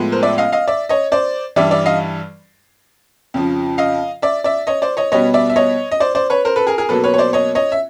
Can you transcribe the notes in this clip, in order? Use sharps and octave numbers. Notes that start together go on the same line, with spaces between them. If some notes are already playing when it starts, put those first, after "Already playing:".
Already playing: A2 F3 G#3 B3
A#4 C5
D5 E5
D#5 F5
D#5 F5
D5 E5
C#5 D#5
C5 D5
G2 E3 G3 D5 E5
D5 E5
D#5 F5
F2 C#3 F3
D#5 F5
D5 E5
D5 E5
C#5 D#5
C5 D5
C#5 D#5
B2 G3 B3 C#5 D#5
D5 E5
E5
C#5 D#5
D#5
C5 D5
C5 D5
B4 C#5
A#4 C5
A4 B4
G#4 A#4
G#4 A#4
B2 F#3 A#3 A4 B4
B4 C#5
C#5
C5 D5
C#5 D#5
C#5 D#5
E5